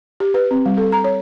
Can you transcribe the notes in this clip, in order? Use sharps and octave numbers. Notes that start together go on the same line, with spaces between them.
G4
B4
C4
G3
A4
A#5
C#5